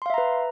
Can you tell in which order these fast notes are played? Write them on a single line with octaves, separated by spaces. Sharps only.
C6 F5 E5 A#5 B4